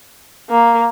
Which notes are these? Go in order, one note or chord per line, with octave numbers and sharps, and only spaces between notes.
A#3